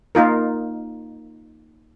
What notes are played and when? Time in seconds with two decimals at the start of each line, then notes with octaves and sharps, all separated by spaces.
0.15 A#3 D#4 F4 A#4